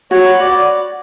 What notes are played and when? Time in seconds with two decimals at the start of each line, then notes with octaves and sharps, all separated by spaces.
0.11 F#4 C#5
0.26 B4
0.40 F#4 D5